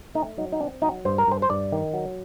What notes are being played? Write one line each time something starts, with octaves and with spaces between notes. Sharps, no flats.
A3 D#4
F#3 D#4
D#4
C4 D4
F#3 D#4
G2 C5
A#4
G2 C5
C5
G2 D5
D#3
F#3